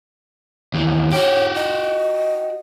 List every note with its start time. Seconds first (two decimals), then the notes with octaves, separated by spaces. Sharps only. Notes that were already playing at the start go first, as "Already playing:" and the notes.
0.74 D#2 E3
1.12 F#4 G4 C#5
1.55 D#5